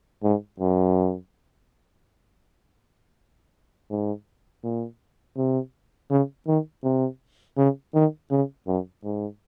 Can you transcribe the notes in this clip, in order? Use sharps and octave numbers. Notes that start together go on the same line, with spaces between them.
G#2
F#2
G#2
A#2
C3
C#3
D#3
C3
C#3
D#3
C#3
F#2
G#2